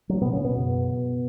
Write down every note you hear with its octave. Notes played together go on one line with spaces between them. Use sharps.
F#3
B2 B3
C#3 C#4
B2 B3
F#2 C#3